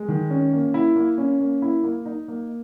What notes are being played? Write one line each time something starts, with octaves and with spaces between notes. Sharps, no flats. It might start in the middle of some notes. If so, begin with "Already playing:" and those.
Already playing: G#3
D#3
C#4
A#3
E4
A#3
C#4
A#3
E4
A#3
D#4
A#3